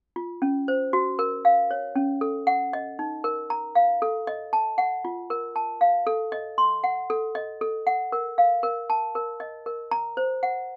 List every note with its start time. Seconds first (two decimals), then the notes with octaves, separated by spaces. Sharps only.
0.16 F4
0.42 C#4
0.68 C5
0.93 F#4
1.19 A#4
1.45 F5
1.71 C#5
1.96 C#4
2.21 A4
2.47 F#5
2.73 D#5
2.99 D#4
3.24 A#4
3.50 A#5
3.75 F5
4.02 A4
4.27 D#5
4.53 A5
4.78 F#5
5.05 F4
5.30 A#4
5.56 A5
5.81 F5
6.07 A4
6.32 D#5
6.58 C6
6.84 F#5
7.10 A4
7.35 D#5
7.61 A4
7.87 F#5
8.12 A#4
8.38 F5
8.63 A#4
8.90 A5
9.15 A#4
9.40 D#5
9.66 A#4
9.91 A#5
10.17 C5
10.43 F#5